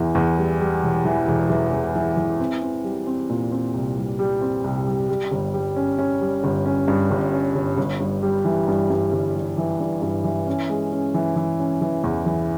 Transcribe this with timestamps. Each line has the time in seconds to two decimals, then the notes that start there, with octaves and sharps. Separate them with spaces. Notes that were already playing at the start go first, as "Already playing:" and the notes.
Already playing: E2 E3
0.15 E2
0.38 G3
0.60 G3
0.83 E1
1.05 E3
1.28 E1
1.50 E3
1.73 E1
1.95 E3
2.17 E3
2.40 C4
2.62 C4
2.84 G3
3.07 C4
3.29 A#2
3.51 C4
3.74 C2
3.97 G3
4.19 G3
4.41 C4
4.64 C2
4.86 G3
5.09 G3
5.31 G1
5.54 G3
5.76 C#4
5.98 C#4
6.21 G3
6.44 G1
6.66 C#4
6.88 G2
7.11 G1
7.33 C#4
7.55 G1
7.78 G1
8.00 G2
8.23 G3
8.45 E3
8.68 G2
8.90 G2
9.12 G1
9.35 G3
9.58 E3
9.80 G2
10.02 G2
10.24 E3
10.47 C#4
10.69 G#3
10.92 C#4
11.14 E3
11.36 E3
11.59 C#4
11.81 E3
12.04 E2
12.26 E3